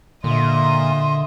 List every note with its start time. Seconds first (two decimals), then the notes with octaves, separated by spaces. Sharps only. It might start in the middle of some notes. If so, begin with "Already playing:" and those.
0.24 A#2 D3 D#5 E5 C6